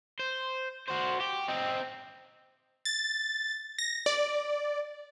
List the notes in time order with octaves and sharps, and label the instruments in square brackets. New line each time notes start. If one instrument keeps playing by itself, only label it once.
[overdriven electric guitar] C5
F#4 C5
G4
C4 D#4
[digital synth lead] A6
A#6
D5